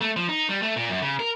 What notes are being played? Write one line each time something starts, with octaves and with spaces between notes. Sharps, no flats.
A3
F3
D#4
G3
A3
A#2
F#2
C#3
A#4